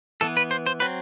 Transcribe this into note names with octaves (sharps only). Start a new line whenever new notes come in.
E3 B3 A4
B4
C5
C5
F#3 C4 B4